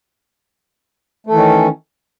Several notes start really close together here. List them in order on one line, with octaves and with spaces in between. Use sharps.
A3 A4 E3 D#3 C#4